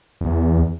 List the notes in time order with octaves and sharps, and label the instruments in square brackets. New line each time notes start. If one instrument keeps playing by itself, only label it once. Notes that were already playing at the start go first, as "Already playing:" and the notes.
[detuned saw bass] E2